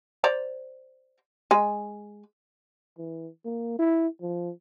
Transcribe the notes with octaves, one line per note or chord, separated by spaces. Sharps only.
C5 D5 A#5
G#3 G#5
E3
A#3
E4
F3